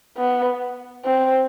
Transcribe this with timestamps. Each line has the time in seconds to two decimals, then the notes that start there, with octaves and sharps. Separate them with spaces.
0.17 B3
1.04 C4